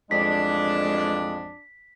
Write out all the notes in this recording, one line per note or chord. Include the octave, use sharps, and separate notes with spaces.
A1 F2 G#3 D4 B6